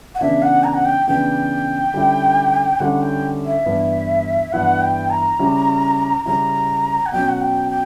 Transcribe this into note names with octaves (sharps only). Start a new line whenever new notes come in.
F#5
C#3 E3 B3 D4 E5
F#5
A#5
F#5
G5
C#3 E3 B3 D4 G5
D3 G3 C#4 E4
D3 G3 C#4 E4 F#5
G5
E5
G2 E3 B3 E4
G2 E3 B3 E4 F#5
G5
A#5
C#3 G3 C#4 E4
C#3 G3 C#4 E4 A#5
F#5
B2 F#3 C#4 G5
F#5
G5
G5